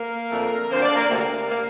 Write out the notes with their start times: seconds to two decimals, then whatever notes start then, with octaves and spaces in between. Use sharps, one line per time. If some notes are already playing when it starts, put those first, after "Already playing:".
Already playing: A#3 A#4
0.31 F2 D3 A3
0.69 D2 D3 F3 A#3 C4 C5
0.82 D4 D5
0.94 A#3 A#4
1.07 D2 C3 G3 A#3
1.47 C3 G3 A#3